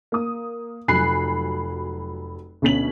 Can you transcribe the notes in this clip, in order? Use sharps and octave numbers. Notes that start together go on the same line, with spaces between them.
A#3 D#6
F1 F#3 G#5 B5 F#6 C7
D2 B2 C#4 B6 F#7